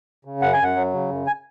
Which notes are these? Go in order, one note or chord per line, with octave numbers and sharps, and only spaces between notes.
C#3
F#2 F#5
G#5
F#2 F#5
F#3
C#3
F#2
G#5